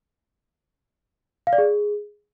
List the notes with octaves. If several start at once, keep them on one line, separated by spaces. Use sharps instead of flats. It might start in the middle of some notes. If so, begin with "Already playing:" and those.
F5
D5
G#4